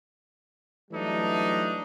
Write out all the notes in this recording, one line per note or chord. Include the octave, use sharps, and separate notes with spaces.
E3 F#3 G3 A3 D4 D#4